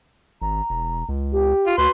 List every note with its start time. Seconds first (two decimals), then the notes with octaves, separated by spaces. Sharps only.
0.42 G#1 A#5
0.70 E1
1.09 C#2
1.32 G4
1.66 F4
1.78 D2 F#4 B4 C6